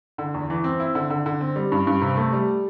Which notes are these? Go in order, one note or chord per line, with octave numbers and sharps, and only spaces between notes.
D3
E2
E3
C4
E4
D3
D3
D3
C4
G3
G2
G2
C3
A3
G3